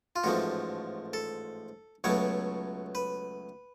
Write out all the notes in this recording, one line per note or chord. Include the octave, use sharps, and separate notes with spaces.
F4
A1 G#2 F3 A3 F#4
A4
C#2 B2 F#3 A3 C#5
B4